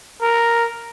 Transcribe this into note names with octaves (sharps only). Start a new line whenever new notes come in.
A#4